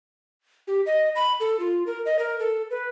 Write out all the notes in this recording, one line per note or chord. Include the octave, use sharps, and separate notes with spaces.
G4
D#5
B5
A4
F4
A#4
D#5
A#4
A4
B4